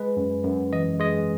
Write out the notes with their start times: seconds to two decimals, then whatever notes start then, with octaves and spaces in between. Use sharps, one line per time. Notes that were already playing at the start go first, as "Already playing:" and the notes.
Already playing: G#3 B4
0.17 F#2
0.44 F#2
0.72 E3 D#5
1.00 G#3 D#5